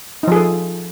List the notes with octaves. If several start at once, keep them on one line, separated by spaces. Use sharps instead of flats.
F3 D#4 G#4 A4